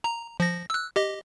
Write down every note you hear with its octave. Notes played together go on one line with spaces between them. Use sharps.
A#5
F3 A#6
E6 F#6
G4 D#5